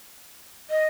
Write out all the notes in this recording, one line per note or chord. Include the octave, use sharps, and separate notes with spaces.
D#5